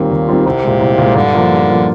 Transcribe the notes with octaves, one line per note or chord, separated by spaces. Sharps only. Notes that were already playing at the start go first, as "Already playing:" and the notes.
Already playing: D#2 A#2 D#3 G3 C4 F4
D#2
D#3 G3 C4 F4
C2 C3
A#2 G#3
C2
A#2 G#3
G2 D3
F3 A#3 F4
G2
F3 A#3 F4